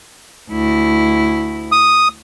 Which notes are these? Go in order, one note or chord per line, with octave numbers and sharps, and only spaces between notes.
D2 E4
D#6